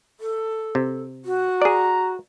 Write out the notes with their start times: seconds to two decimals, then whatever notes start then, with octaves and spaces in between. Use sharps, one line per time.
0.20 A4
0.75 C3
1.25 F#4
1.62 G#4 D5 A#5